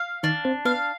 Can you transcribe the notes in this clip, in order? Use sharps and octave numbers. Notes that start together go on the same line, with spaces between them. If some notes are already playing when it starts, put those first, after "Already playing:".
Already playing: F5
D#3 D4 D#4
C4 C5
B3 B4 F5